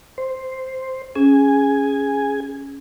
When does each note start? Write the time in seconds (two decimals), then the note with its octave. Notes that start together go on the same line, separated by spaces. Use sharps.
0.18 C5
1.15 C#4 G#4 G#5